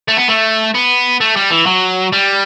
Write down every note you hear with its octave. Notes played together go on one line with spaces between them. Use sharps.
A3
B3
A3
B3
A3
G3
E3
F#3
G3